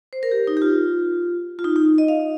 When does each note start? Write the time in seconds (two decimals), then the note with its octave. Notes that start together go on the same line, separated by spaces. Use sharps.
0.13 C5
0.23 A#4
0.32 G4
0.47 D#4
0.57 G4
0.62 F4
1.59 F4
1.64 D#4
1.76 D#4
1.98 D#5
2.08 F5